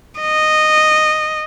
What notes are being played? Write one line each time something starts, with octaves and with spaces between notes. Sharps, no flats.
D#5